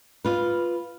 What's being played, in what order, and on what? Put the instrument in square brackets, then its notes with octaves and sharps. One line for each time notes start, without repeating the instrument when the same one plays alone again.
[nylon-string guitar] F4 B4